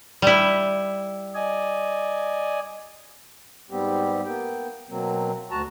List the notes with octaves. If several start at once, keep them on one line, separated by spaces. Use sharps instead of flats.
G3 E4
D5 D#5 G#5
G#2 G3 B3 C4 G4
A#3 B3 G5
B2 F#3 A#3 C4
D2 F#4 A5 A#5